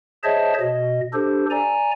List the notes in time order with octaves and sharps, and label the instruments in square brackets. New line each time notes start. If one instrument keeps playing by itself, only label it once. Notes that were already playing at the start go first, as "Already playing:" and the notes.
[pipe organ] G#4 C5 C#5 D#5 E5 A5
B2 D#5
D4 G4 A4 C5
D5 G#5 A#5